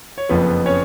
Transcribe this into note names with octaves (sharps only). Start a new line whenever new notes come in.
C#5
F#1 F2 F3 B3 B4
C#4 C#5